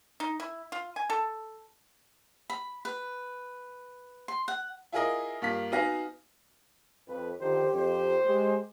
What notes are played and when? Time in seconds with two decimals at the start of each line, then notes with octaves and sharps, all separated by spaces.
0.20 D#4
0.40 E4
0.72 F4
0.96 G#5
1.10 A4
2.50 B5
2.85 B4
4.28 C6
4.48 F#5
4.92 E4 F4 G#4 A#4 D#5
5.42 G2 A#3 F4 B6
5.72 B3 D#4 F#4 F5 G#5 A#6
7.08 F2 B4
7.40 D3 D#3 F3 G4 C5
7.74 F2 C5
8.25 G#3 G4